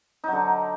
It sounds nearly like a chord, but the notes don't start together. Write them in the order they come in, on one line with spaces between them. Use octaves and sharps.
D#4 F#3 D3